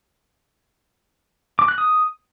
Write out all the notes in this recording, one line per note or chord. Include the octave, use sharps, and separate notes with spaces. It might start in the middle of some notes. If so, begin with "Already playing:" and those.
D6
F#6
D#6